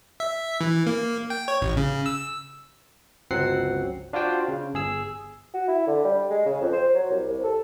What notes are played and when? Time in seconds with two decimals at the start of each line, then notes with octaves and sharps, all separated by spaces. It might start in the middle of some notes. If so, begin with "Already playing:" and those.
0.20 E5
0.61 E3
0.87 A#3
1.30 G5
1.48 C#5
1.62 A1
1.77 C#3
2.06 E6
3.31 G1 C#2 F#3 C4 F#5 C7
4.13 D4 F4 F#4 C5 G5
4.48 C#3
4.74 G1 G#4 E6
5.54 F#4
5.68 E4
5.87 D3
6.04 G3
6.30 G#3
6.46 C#3
6.61 F2
6.72 C5
6.94 F#3
7.11 C2
7.29 C2
7.44 A4